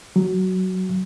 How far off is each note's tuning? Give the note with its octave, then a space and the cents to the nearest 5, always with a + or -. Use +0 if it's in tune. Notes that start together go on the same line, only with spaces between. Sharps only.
F#3 +10